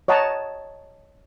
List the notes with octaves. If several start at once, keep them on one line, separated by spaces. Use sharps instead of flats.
C#5 D#5 F#5 A5 A#5